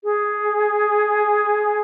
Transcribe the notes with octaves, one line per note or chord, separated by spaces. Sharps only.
G#4